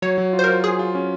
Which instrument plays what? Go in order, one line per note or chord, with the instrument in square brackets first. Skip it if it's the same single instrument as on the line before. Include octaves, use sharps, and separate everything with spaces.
[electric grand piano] F#3 [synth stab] C#5
[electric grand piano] F#3
F4
[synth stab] C5
[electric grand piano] F4 [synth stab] A#4
[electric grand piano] F4 [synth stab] G#4
[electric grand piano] F4
C#4